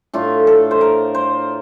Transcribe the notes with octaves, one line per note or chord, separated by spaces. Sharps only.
A2 A3 D4 F4
A4
C5
A#4
C5